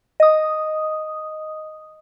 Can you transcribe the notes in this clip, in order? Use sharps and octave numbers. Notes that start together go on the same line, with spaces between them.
D#5 D#6